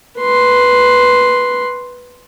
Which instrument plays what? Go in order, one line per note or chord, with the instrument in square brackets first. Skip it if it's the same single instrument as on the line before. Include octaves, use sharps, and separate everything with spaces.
[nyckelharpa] B4 C6